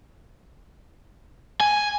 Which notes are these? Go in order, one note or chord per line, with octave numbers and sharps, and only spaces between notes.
G#5